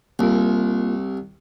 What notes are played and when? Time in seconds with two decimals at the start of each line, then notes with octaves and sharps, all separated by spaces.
0.19 C2 A#3 F4